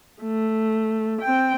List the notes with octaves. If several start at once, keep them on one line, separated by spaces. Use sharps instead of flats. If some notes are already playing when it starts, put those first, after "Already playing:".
A3
C4 G5